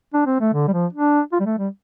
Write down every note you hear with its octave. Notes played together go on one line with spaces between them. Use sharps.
D4
C4
A3
D3
G3
F3
D4
F4
G3
A3
G3